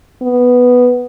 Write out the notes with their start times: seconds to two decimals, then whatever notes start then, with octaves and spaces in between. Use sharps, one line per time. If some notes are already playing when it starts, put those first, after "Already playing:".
0.22 B3